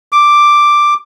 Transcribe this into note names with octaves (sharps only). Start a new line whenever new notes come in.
D6